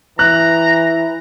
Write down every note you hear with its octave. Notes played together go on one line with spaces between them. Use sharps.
E3 A#5 F#6